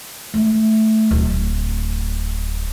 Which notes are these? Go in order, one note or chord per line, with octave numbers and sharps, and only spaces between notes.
A3
D1